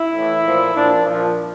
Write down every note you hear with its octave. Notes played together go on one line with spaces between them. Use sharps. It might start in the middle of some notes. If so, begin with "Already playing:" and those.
Already playing: E4
A2 E3
A#2 F3
A#2 F3 D4
A#2 F3